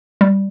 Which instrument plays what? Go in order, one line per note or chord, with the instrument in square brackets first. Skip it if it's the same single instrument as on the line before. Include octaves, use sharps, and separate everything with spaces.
[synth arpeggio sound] G3